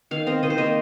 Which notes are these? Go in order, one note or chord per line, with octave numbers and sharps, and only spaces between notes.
D#3 F5
C4 D#5
D#3 D#5
C5
A#3 D#5